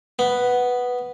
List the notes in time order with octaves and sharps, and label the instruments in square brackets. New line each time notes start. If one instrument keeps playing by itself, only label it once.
[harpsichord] B3